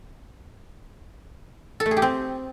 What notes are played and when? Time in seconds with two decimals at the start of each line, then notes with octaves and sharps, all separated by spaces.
1.80 A4
1.86 A3
1.91 G#4
1.97 G4
2.02 C4